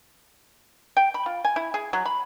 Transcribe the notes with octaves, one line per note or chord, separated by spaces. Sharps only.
G5
B5
F4
G#5
E4
G#4
F#3
B5